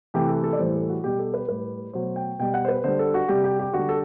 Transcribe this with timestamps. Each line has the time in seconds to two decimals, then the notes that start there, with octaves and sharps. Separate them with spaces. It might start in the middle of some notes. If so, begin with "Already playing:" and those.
0.14 C3 E3 A3 G4
0.29 A4
0.44 A4
0.53 D5
0.59 A2 E3 G3 C5
0.75 A4
0.89 F#4
1.04 B2 G3 G4
1.19 A4
1.34 B4
1.49 A2 G3 B4
1.93 B2 F#3 A3 C5
2.16 G5
2.39 B2 G3 G5
2.54 F#5
2.65 C5
2.68 B4
2.84 D3 G3 C5
2.99 A4
3.14 F#4
3.28 C3 G3 G4
3.44 G4
3.59 G4
3.74 D3 G3 F#4
3.89 A4